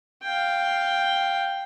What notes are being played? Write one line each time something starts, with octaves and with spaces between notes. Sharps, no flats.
F5 G5